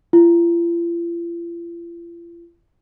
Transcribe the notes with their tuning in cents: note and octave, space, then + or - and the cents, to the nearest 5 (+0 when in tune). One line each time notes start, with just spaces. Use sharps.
F4 -45